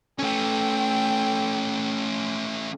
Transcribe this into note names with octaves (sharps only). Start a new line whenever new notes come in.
A3 C#4 A4 G5